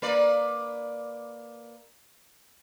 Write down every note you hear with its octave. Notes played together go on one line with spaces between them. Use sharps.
A#3 B4 D5